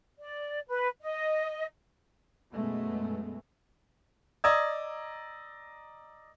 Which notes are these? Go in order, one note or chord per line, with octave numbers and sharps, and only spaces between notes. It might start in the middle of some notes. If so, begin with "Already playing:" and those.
D5
B4
D#5
F#2 B2 G#3 A3 B3
D5 D#5 A#5 D#6 E6 G#6